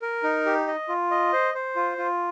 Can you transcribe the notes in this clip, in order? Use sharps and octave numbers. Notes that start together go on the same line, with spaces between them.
A#4
D#4
G4
D#5
F4
D#5
C5
C5
F4
F4